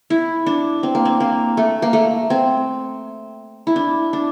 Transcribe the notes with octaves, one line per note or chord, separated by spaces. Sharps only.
E4
D4
C4
A#3
C4
A#3
A3
A#3
A3
C4
E4
D4
D4